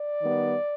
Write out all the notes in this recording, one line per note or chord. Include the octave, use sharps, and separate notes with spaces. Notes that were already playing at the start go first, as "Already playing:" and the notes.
Already playing: D5
D#3 G3 B3